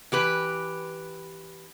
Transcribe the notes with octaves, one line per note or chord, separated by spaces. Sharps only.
E3 G4 B4